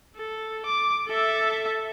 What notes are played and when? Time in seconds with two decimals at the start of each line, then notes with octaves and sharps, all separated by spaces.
0.16 A4
0.66 D6
1.08 A4 E5